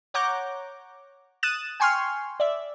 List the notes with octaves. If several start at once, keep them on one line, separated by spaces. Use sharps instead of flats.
C#5 F#5 A#5 D6 G6
D#6 F#6 A6 D#7 E7
G5 G#5 C6 C#6 F6
D5 E5